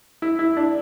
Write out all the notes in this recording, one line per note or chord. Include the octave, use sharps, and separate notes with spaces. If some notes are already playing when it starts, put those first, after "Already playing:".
E4
E4
D4